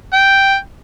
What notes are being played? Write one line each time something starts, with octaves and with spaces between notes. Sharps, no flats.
G5